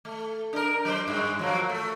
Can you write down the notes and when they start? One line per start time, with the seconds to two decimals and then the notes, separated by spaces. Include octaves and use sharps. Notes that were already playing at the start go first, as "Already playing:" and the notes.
0.05 A3
0.53 D4 A#4
0.85 F#3 C5
1.08 G2 G#3
1.39 F3 F#3 A#3
1.69 A3